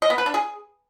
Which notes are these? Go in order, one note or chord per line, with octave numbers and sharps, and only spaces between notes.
D#5
B3
B4
D4
G#4